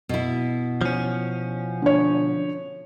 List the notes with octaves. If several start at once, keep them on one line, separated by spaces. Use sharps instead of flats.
B2 E4
F3 C#4
D3 C#5